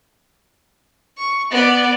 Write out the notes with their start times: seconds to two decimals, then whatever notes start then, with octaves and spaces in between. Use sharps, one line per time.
1.17 C#6
1.51 B3 D5